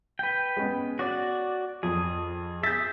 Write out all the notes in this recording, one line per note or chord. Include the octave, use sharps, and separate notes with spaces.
B4 G5
G#3 B3 C#4
F#4 C#5 D5
F2 G#4
G#4 E5 G6 A6